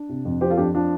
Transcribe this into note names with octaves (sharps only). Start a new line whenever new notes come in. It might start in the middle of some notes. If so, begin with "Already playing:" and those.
Already playing: D4
C3
F2
F3 G4 C5
F4 A4
F2 D4 G4
F3 D4